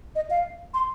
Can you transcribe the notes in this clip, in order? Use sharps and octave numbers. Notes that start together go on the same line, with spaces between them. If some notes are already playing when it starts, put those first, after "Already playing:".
D#5
F5
C6